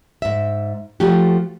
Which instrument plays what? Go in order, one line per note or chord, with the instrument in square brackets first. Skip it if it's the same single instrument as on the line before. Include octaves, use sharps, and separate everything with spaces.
[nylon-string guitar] G#2 E5
F3 A3 F#4 G4